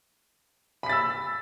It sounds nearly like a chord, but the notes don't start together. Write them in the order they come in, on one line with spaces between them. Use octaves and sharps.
B5 B6 A6 E6